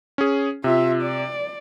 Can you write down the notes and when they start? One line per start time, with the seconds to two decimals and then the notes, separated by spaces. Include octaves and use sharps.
0.18 C#4 G#4
0.64 C3 F4 E5
1.02 D5